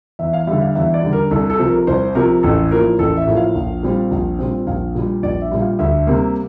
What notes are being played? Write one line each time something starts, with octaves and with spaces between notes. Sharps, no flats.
E2 E5
F5
D3 G3 E5
F5
E2 E5
D5
D3 G3
A#4
C2 A4
A4
C3 F3
A#4
C2 C5
C3 F3 A#4
A1 A4
A2 F3 A#3 A#4
A1 A4
E5
A2 F3 A#3
F5
A#1
A#2 G3 C4
A#1
A#2 G3 C4
A#1 F5
A#2 G3
A#1 D5
E5
A#2 G3
F5
D2 E5
C3 G3 A#3